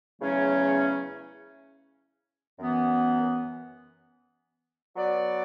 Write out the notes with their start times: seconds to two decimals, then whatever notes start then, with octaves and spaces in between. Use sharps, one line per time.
0.20 E2 C#3 F#3 A3 C#4
2.58 F#2 E3 B3
4.96 F#3 B3 F#4 B4 D5